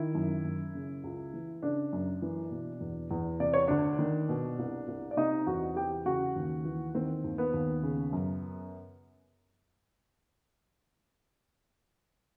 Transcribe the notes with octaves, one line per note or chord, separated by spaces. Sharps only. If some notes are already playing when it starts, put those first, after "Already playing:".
Already playing: D#3 E4
F#2
F#2
C#3
C#2
E3
C#3 D4 D5
F#2
E3
B2
E2
E2
C3 D5
C#5
D2 D4 D5
D#3
B2
C2
C2
D5
C3 D#4 D#5
E2 F#4 F#5
E3 G4 G5
C#3 F#4 F#5
D#2
E3
D#3 C4 C5
D#2
B3 B4
D#2
C#3
F#2